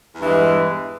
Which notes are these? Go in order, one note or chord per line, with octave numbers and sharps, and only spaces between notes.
E2 G2 E3 G#3